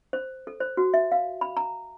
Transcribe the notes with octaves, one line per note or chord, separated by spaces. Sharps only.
C5
A4
C5
F#4
E5
F5
B5
A#5